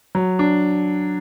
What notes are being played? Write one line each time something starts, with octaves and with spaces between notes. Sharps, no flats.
F#3
D4